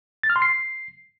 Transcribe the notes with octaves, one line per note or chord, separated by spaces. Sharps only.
A6
F6
C6
C7